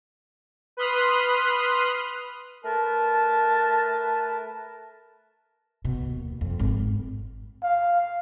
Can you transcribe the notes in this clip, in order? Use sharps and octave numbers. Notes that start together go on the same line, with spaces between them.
B4 B5 C6 D#6 F6 F#6
A3 A#4 B4 A5
B2
D#2
F2
G#1
F5